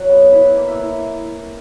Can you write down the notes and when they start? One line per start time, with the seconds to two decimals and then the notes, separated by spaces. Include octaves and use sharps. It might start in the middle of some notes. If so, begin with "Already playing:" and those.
Already playing: F#3 F#5
0.09 B3
0.32 E4 E5
0.56 A#3
0.68 E5
0.80 E4